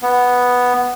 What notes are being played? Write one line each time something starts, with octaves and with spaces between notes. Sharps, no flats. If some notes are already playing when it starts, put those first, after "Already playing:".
B3